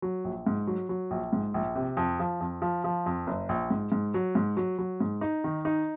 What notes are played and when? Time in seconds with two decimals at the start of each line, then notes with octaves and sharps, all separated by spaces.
0.02 F#3
0.24 A#1
0.47 G#2
0.67 F#3
0.89 F#3
1.11 A#1
1.33 G#2
1.54 A#1
1.75 C3
1.97 F2
2.20 F3
2.41 F2
2.62 F3
2.84 F3
3.06 F2
3.27 F#1
3.49 A#1
3.71 G#2
3.92 G#2
4.14 F#3
4.35 G#2
4.57 F#3
4.79 F#3
5.00 G#2
5.21 D#4
5.44 D#3
5.65 D#4